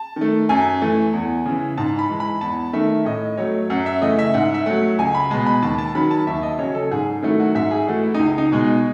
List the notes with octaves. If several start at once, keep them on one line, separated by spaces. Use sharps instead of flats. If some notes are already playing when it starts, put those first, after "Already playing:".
Already playing: A5
D#3 A3
F#2 G#5
E3 A3
E2
C#3 E3
G#2 A5
B5
E3 G#3
B5
E2 A5
D#3 A3 E5
A2 D#5
F#3 A3 C#5
F#2 F#5
E5
C#3 E3 A3 D#5
E5
G#2 F#5
E5
F#3 A3 F#5
C#2 G#5
B5
B2 G#3 A5
B5
D#2 A5
A5
D#3 F#3 B5
A5
D#2 E5
D#5
C#3 F#3 C#5
A4
G#2 G#4
D#3 F#3 A3 E4
F#4
G#2 E5
G#4
E3 A3 F#4
E4
C#2 D#4
D#4
B2 G#3